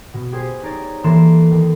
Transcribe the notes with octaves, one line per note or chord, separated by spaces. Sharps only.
B2
G4 G#4 C5
D#4 C#5 D5
E3 A#3 A4 C6 D7 E7
D#2